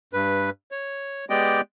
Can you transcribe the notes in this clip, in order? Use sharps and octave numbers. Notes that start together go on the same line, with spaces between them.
G2 B4
C#5
G#3 B3 G4 D5 D#5 G5